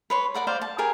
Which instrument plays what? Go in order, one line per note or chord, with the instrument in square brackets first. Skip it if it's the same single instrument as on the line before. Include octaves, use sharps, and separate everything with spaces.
[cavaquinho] B4 C#5 C6
A#4 D5 F#5 A#5
C5 D5 F5
A5
G4 G#4 A#4 G#5